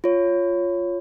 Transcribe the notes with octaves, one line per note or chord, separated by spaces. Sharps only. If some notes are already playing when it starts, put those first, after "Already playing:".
F4 C#5